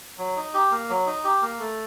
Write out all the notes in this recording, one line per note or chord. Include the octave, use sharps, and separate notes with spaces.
F#3
D#4
G4
A#3
F#3
D#4
G4
A#3
A3